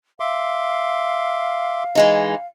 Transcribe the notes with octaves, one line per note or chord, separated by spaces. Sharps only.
E5 F5 C6 D6
E3 G#3 D#4